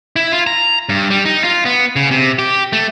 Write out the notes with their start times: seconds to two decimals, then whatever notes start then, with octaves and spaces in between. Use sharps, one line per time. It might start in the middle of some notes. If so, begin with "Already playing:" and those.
0.16 E4
0.32 F4
0.47 A#5
0.89 G2
1.10 G3
1.25 D#4
1.44 F4
1.65 B3
1.96 C#3
2.11 C3
2.39 G4
2.73 A3